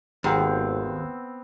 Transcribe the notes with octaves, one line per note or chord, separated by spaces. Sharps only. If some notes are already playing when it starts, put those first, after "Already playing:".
G#1 D#2 B3 C4